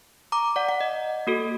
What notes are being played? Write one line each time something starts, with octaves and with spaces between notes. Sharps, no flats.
A#5 D6
D5 F#5
F#5
D#5
A#3 F#4 A4